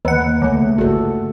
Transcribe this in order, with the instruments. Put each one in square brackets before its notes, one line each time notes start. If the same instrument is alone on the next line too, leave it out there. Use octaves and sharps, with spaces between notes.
[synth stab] D#2 F#5 [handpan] B4
[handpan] A#3
[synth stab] C#2 [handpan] C#3 A3
[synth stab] G1 [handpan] F#4 A4